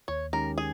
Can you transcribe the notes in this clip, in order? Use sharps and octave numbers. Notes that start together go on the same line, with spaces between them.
D#2 C#5
D#3 G#3 C#4 G4 A#4
G#4